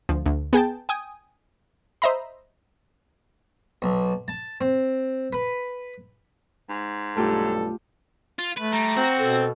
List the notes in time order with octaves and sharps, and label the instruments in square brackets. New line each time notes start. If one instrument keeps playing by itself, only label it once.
[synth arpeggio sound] D2 F3
D2
B3 G#4 G5 A5
G5 G#5 D#6
C5 D#5 E5 A#5 B5
[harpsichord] B1
A5
C4
B4
[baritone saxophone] G#2
[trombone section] B1 G2 A4 [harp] A3 F4 G4
[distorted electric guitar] F4
[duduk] A3 [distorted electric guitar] B4
[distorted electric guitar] G3 [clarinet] A#5
[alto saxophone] C4 [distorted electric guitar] F#4
[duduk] B2 [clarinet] A4